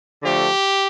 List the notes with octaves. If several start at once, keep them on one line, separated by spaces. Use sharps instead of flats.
D3 F3 A3 G4